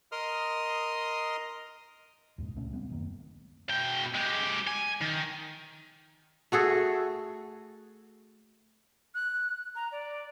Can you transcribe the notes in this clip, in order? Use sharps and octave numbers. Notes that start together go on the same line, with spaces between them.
A#4 D#5 C6 D#6 F6
D#2 G#2 B2
C#2 A#2 A3 C#4
G3 B3 C4
D#1 F#2 D#3 A#3
B2 G5
G#3 G4
G#5
D#3
A3 F#4 G#4 A4
F#6
A#5
D5